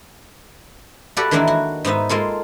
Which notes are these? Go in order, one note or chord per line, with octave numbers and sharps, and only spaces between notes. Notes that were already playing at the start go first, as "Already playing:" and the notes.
F#4 G4 A4 B4 D5
D#3 E3 G#3 A#3 D4 E4
F#4
G#2 B3 D#4 E5
G#3 A#3 F4 A4